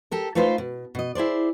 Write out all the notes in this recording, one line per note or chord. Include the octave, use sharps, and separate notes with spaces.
G4 A4 A#4
A3 D#4 F4 B4 C5
B2
B2 D#5
E4 G#4 C5 D5